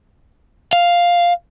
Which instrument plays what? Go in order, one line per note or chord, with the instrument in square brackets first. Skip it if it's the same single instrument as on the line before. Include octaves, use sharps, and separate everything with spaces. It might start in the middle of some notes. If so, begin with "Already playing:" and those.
[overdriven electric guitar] F5